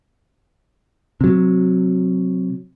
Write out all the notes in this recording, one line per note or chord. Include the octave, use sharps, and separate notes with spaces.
C3 F#3